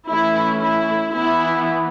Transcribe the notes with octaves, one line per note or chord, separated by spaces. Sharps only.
E3 A3 C#4 E4
E4
E3 B3 E4